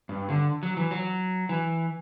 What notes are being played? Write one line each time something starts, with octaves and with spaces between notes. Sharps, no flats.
G2
D3
F#3
E3
F#3
E3